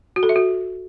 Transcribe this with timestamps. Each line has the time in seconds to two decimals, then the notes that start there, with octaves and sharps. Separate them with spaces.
0.16 F#4
0.23 A4
0.29 E5
0.36 F#4